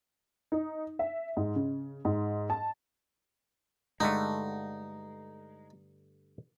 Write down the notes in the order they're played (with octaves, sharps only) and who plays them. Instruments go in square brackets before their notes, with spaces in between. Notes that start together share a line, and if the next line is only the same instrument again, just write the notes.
[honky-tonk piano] D#4
E5
G#2
C#3
G#2
A5
[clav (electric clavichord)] G2 D3 A3 [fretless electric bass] G#3 [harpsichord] D#4